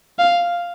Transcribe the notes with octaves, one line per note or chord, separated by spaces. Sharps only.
F5